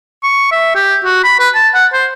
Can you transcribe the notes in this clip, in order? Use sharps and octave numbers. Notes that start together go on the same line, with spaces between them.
C#6
E5
G4
F#4
B5
B4
A5
F#5
C5